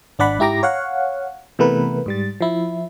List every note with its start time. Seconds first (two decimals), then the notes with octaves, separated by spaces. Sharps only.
0.19 G#1 D4 D5 F#5 B5
0.39 G#2 E4 G4 A#5 D6 A#6
0.63 C#5 F5 F#5
1.59 C3 E3 A3 B3 A#4 B4
2.06 G#2 G3 A6
2.41 F3 E4